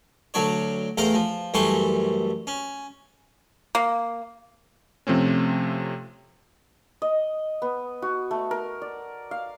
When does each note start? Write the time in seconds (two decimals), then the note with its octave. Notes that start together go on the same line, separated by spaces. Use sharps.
0.34 D2 F#3 D4 C#5
0.98 E2 A2 A#4 F5 A#5
1.14 F3
1.54 F#2 E3 G3 A3 C6 C#6
2.47 C#4
3.75 A#3
5.07 C3 F3 A3 C4 C#4
7.02 D#5
7.62 B3
8.02 F#4
8.31 A3
8.51 A#4
8.82 D5
9.31 F5